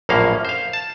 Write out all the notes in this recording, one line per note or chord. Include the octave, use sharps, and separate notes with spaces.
A#1 F#2 A2 A#3 C#4 F5
C5 F5
A5